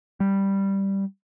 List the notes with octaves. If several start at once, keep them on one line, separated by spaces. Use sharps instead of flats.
G3